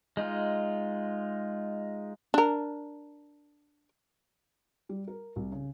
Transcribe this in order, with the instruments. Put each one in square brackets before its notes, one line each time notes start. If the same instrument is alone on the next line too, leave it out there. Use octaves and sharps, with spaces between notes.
[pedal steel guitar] G#3 D#4 F4
[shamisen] D4 A#4
[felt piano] G3
A#4
C2
C#3